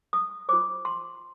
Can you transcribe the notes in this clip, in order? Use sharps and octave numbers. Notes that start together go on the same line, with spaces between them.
D#6
F4 C5 D6
C6